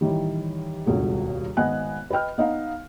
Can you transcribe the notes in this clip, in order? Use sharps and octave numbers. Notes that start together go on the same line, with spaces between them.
A1 D#3 E3 G3
D#1 C#2 G2 B2 A4
G#1 B3 D#5 G#5 F#6
B4 D#5 G5 F6
B3 D#4 D#5 F5